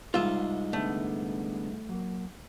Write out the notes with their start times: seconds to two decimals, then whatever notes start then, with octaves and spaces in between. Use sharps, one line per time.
0.14 C2 G#2 F4 E5
0.73 D3 G3 A3 B3
1.89 F#3 A#3